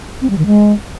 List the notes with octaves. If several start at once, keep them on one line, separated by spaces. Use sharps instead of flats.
C4
G3
D#3
G#3